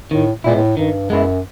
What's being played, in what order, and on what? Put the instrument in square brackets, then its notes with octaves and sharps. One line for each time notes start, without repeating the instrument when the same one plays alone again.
[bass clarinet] A2 [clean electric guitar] D#3
[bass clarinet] A#2 [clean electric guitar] G#3 B3 E4
[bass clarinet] A2
[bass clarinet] G2 [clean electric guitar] D#3
[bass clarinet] F#2 [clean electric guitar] G#3 B3 E4